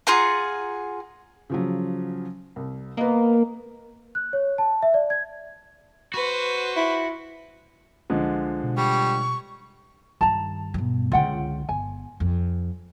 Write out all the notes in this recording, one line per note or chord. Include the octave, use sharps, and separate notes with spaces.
F4 G#4 F#5 A#5
C#3 F3 F#3
C2
A#3 B3 D#5
F#6
C#5
A5
E5
D5
G#6
F#4 B4 C5
E4
C2 D3 F3 G#3
B2
G3 C#6
G2 D#3 A5 A#5
G2 B2
C#2 D3 F4 F#5 G5
G1 G#5
F2